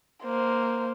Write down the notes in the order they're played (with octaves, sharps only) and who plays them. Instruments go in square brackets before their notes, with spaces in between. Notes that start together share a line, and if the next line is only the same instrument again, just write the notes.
[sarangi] A#3 [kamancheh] C5